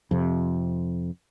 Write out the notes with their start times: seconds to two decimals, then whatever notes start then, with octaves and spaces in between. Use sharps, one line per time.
0.11 F2 C3